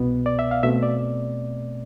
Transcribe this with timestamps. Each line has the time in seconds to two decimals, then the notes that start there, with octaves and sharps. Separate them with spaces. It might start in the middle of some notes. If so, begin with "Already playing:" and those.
Already playing: C2 B2 B3
0.26 D5
0.39 E5
0.51 F5
0.63 B2 A3 C4 E5
0.83 D5